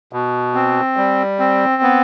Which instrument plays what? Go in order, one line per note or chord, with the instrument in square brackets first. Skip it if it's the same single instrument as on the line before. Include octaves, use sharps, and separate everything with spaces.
[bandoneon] B2
C4
G3
C4
B3